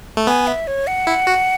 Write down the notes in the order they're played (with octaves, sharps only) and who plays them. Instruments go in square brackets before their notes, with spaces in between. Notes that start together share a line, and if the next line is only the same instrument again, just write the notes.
[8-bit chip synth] A3
[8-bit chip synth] B3 [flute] G#5
[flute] E5
C#5
F#5
[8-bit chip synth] E4
F#4